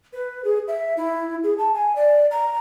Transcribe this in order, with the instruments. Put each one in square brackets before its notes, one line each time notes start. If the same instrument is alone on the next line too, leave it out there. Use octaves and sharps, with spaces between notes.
[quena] B4
G#4
E5
E4
G#4
A5
G#5
D5
A#5